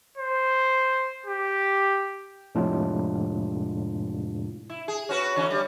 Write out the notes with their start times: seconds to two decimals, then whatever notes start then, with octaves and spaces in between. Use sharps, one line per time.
0.18 C5
1.26 G4
2.55 F2 A2 C3 G#3 D4 F4
4.70 E4
4.88 G#4
5.09 C#4 F#4 B4
5.36 D3 E3 C#4
5.51 G3